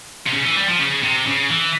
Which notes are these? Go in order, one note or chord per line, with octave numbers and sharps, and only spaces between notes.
C3
C#3
E3
G3
F3
C#3
C3
C#3
E3